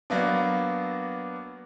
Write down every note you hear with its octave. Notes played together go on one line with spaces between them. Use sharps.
F#3 A#3 B3 D4